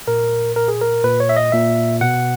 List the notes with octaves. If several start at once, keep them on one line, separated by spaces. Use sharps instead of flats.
A#2 A#4
A#2 A#4
G#4
A#4
A#2 B4
C#5
E5
D#5
A#2 E5
B2 F#5